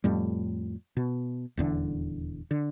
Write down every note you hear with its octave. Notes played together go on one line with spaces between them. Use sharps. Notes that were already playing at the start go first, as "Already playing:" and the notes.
F2 A2 G3
B2
D#1 E2 D3
D3